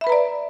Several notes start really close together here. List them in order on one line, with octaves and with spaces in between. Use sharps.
E5 B5 B4 A#5 D5